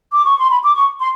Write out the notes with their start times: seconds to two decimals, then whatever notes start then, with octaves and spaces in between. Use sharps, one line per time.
0.12 D6
0.24 C#6
0.38 C6
0.50 B5
0.63 D6
0.75 C#6
1.00 C6